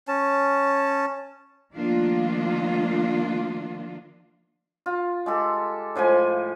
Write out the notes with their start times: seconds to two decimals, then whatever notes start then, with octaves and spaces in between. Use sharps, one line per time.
0.08 C#4 A5
1.74 D#3 F3 A3 A#3 D4 F4
4.86 F4
5.26 G#3 G4 A4
5.95 A2 F3 G#3 G#5